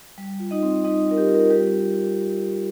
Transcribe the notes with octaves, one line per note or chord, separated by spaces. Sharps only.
G3
F4
D#4 D#5
C4
G3 D#4 D#5
G3 A#4
G4
F4
A#4
G3 G4